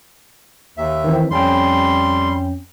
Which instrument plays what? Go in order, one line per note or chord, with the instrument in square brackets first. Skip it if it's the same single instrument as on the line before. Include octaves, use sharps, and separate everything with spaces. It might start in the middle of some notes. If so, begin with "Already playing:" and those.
[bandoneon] D#2 E5
[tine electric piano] D#3 E3 C4
[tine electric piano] F2 C#4 G5 [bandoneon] G3 C6